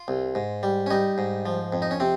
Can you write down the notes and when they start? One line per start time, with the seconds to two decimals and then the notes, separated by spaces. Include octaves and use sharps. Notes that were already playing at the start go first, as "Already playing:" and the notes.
Already playing: F4
0.08 C2
0.35 G#2
0.63 G3
0.86 C#4
0.90 G3 D#4
1.18 G#2
1.46 F3
1.73 F2
1.82 D#4
1.91 C#4
2.00 C3 C4